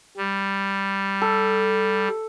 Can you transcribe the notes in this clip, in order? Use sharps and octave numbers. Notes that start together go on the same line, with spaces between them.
G3
A4